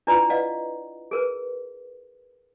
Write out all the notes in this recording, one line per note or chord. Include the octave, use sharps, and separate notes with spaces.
D4 E4 F4 B4 D5 A#5
B4 D5 D#5 F5 F#5
G#4 A#4 B4